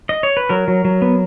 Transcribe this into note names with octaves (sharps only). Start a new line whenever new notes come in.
D#5
C#5
B4
F#3 A#4
F#3
F#3
B3